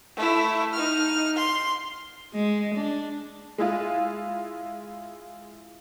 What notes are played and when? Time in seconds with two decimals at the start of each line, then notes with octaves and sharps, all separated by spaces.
0.16 A3 E4
0.74 D#4 F6
1.37 C6
2.34 G#3
2.76 D4
3.58 G#3 E4 F4